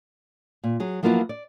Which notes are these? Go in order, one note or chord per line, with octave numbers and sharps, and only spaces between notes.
A#2
F#3 G#4
F3 F#3 A#3 B3 E4 F4
D5